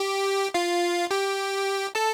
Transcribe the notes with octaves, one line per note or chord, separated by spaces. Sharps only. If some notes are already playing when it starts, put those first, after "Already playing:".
Already playing: G4 G5
F4 F5
G4 G5
A4 A5